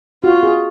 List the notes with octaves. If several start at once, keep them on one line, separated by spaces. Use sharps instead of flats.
F4 F#4
G#4